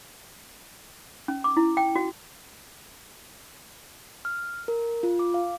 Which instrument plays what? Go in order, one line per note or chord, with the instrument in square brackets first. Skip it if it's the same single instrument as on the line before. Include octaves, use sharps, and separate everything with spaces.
[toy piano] C#4
D6
E4
G5
F#4
[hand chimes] F6
A#4
F4
D6
F5